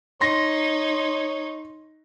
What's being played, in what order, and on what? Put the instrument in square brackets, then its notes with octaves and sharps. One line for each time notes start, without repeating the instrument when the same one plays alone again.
[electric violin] D#4 [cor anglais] C#5 [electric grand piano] C6 A#6